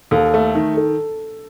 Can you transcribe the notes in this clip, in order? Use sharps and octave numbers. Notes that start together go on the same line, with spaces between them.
D#2 A4
A3
D#3
A4